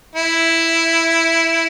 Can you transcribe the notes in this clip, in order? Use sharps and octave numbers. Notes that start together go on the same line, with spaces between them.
E4